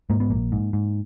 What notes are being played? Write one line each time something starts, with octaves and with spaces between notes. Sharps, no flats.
G#2 A#3
B3
A#1 A#3
G#2
G#2